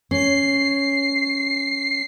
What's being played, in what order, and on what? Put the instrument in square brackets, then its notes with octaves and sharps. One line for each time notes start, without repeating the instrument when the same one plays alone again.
[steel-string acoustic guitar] C#4 [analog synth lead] C7